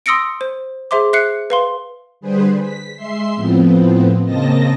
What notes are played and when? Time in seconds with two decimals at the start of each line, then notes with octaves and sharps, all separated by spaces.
0.06 C6 D#6 E6 A#6 C#7 D7
0.41 C5
0.91 G#4 C5 E5 C6 D6
1.13 E5 F#6 C7 C#7
1.50 B4 F5 C6
2.21 D3 G3 G#4 B4 C5
2.60 B6
2.94 G#3 E5 C6 C7
3.36 A2 F3 B3 C4
4.24 C#3 A#3 C4 D#5 A5 A#6